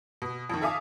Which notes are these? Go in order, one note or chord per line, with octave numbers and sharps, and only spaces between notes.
B2
F2 D#3
A4 E5 F5 G#5 D6 D#6